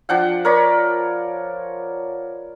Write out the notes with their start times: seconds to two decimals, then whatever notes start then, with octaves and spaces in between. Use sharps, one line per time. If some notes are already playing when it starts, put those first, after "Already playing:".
0.09 F3 D4 F#5 G5
0.45 A#4 C#5 D5 B5